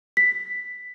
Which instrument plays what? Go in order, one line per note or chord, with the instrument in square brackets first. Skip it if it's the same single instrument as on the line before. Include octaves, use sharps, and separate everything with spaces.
[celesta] B6